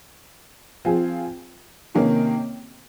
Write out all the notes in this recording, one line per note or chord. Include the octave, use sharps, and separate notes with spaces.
F3 C4 F4 G#4
C3 D#3 A#3 C#4